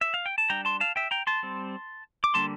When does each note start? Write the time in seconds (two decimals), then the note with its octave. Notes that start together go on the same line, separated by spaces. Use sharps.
0.01 E5
0.14 F5
0.26 G5
0.38 A5
0.50 G3 D4 G5 A#5
0.65 A5 C6
0.80 F5 A5
0.96 E5 G5
1.11 G5 A#5
1.27 A5 C6
1.43 G3 C4
2.24 D6
2.34 D3 G3 A#3 D4 A5 C6